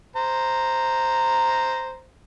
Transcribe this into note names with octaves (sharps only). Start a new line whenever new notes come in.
C5 A#5